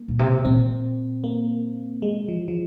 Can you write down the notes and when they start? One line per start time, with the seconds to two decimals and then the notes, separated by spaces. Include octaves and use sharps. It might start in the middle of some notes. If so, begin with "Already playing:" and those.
Already playing: A#3
0.08 A#2
0.19 C3
0.45 A#2 C4
1.24 A#3
2.02 G#3
2.28 F3
2.48 F3